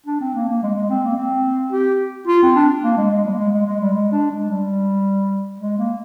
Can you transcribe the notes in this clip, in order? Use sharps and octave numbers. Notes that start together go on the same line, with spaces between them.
D4
C4
A#3
A#3
G#3
G#3
C4
A#3
C4
G4
F4
C4
D4
A#3
G#3
G#3
G3
A#3
G#3
G#3
G#3
G3
G#3
D4
G#3
G3
G#3
A#3